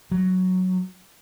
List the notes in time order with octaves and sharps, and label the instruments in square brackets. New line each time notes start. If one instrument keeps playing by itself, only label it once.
[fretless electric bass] F#3